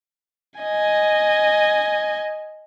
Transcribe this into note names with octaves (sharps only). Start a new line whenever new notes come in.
D#5 G#5